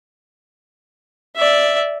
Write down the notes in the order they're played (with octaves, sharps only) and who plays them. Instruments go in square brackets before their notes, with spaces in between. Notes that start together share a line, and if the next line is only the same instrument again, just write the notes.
[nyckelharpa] D5 E5